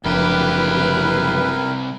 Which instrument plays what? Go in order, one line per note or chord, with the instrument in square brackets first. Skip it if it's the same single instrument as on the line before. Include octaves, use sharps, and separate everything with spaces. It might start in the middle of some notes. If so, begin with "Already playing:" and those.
[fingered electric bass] F#1 F3 D4 [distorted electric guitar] C2 G4 [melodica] E4 A#4 [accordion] B4